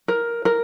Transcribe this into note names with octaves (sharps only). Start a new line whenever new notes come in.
A#4
A#4